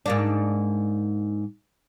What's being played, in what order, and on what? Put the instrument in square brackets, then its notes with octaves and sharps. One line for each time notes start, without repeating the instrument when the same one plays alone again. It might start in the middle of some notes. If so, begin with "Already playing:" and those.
[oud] G#2 A#3 D4